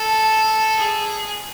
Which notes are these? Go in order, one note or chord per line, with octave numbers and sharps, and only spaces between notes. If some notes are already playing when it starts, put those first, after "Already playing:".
Already playing: A4
G#4